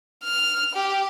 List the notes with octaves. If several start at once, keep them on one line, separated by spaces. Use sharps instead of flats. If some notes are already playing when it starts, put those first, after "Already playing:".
F6
G4